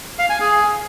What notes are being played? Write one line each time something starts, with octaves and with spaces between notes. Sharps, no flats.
F5
G#5
G#4